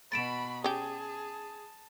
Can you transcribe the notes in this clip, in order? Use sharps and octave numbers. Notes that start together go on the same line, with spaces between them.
B2 F#4 B5 A6 D7 E7
C#4 G4 G#4 A5